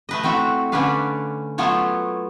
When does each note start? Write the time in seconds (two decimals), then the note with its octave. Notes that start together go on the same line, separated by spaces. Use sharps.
0.09 A3 B4 D#5
0.23 A3 C4 E4 F#4
0.72 D3 A3 C#4 B4 D5 F5
1.58 F#3 A3 B3 F4 C#5